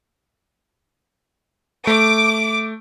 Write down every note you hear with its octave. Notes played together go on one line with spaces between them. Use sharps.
A3 D6